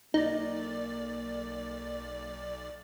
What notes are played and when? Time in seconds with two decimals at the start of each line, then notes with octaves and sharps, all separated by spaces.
0.14 B1 A#3 D#4 D5